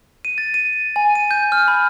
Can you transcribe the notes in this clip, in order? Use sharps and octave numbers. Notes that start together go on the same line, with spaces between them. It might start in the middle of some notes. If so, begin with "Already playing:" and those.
D#7
A6
D#7
G#5
D#7
G6
F6
B5